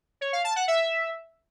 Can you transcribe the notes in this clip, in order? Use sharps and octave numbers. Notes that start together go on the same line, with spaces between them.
C#5
F5
A5
F#5
E5